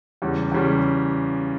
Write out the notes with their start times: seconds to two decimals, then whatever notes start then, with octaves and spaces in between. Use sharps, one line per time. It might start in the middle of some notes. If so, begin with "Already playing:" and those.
0.22 E2 C#3 G3
0.52 E2 C#3 G3